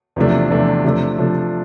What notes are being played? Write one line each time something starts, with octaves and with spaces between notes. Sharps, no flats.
E2 C3 F3 A3 D4
E2 C3 F3 A3 D4
C3 F3 A3 D4
C3 F3 A3 D4